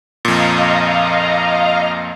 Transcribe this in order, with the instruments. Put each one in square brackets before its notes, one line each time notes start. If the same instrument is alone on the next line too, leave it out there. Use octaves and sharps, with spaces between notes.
[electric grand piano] F2 A#2 [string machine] D#5 F5 A#5